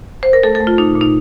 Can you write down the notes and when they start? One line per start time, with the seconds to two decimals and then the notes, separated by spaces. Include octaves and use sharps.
0.23 C5
0.33 A#4
0.43 A3 A4
0.55 A4
0.61 A3
0.67 F4
0.78 A#2 D#4
0.96 A#2
1.01 D#4